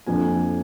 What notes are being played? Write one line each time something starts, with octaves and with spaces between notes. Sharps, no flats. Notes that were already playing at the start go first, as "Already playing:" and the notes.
F2 D3 F3 A#3 G#5